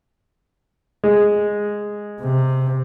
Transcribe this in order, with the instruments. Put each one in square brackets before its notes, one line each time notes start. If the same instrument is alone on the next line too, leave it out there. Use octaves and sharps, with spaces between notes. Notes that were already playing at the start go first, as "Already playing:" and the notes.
[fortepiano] G#3
[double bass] C3